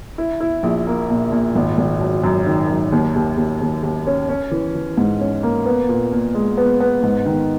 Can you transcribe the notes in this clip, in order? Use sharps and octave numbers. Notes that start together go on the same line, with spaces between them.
E4
E4
A#1
A#3
A#2
A#2
G#1
G#1
F#3
F#2
D#3
F#2
D#2
D#2
D#2
D#2
D#2
C#4
C#4
E3
E3
G#2
C#4
A#3
B3
A#2
A#2
G#3
B3
B3
G#2
D#3